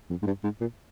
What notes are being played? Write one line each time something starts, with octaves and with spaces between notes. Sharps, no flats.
F2
G#2
G2
G#2
A#2